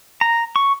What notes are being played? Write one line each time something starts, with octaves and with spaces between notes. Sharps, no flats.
A#5
C#6